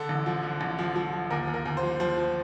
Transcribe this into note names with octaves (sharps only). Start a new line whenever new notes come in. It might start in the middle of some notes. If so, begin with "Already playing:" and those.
Already playing: D3 A4
A1
F3
D3
A1
F3
F3
F3
D#2 A#4
D#2
A#4
D#2
C5
F3
F3 C5
F3